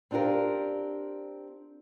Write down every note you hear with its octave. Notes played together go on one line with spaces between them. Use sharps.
C4 D4 F4 G4 A#4